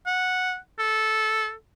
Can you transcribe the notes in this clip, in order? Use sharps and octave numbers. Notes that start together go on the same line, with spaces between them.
F#5
A4